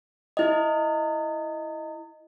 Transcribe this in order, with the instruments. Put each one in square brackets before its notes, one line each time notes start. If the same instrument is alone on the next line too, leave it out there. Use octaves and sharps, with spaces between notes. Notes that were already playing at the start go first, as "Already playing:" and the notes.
[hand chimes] E4 D#5